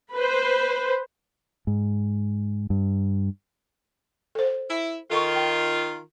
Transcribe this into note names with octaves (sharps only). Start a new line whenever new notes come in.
B4 C5
G#2
G2
A4 C5
E4
D#3 F4 A4 C#6
G5